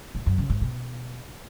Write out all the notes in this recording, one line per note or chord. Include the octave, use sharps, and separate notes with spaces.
A2
F#2
C#3
G#2
B2